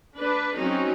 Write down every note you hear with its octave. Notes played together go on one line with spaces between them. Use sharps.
D4 B4
F#3 C4 C#4 D#4